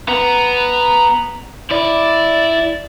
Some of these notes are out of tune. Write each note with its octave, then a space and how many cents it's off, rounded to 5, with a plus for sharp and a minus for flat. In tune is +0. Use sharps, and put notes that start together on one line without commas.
B3 +0 A#5 +0
E4 +0 D5 +0